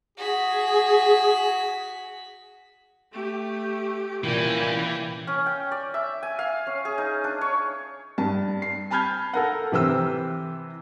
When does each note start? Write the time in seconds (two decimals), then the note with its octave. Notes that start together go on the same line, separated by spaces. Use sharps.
0.18 F#4 G#4 B6
3.12 A3 G4
4.24 C2 A#2 E3 C#4 G5
5.27 C#4
5.46 G5
5.71 D5
5.94 E5
6.23 G#5
6.39 F5
6.67 C#4
6.85 G#4
6.98 D#4
7.24 D4
7.41 C#5
8.18 G2 A5
8.62 C7
8.91 G#5 A5 B5 F6 G6 G#6
9.33 A4 A#4 F#5
9.72 C3 E3 B4 C5 G5 E6